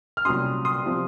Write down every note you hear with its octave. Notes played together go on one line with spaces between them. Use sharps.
F6
C2 A#2 F#3 C#4 C6 D#6
C6 D#6
C3 F3 C4